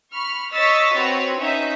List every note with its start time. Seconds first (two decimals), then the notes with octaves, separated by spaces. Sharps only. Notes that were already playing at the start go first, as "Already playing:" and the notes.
0.13 B5 C#6 F6
0.52 C#5 D#5 C#6 E6 A6 B6
0.94 C4 F#4 B4 C#5
1.37 C#4 D#4 E5